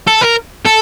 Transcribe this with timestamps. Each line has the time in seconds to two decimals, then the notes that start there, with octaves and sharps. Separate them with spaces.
0.08 A4
0.22 A#4
0.66 A4